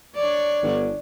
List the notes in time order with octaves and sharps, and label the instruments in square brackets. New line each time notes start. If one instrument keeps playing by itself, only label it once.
[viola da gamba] D4 C#5 D5
[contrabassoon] G1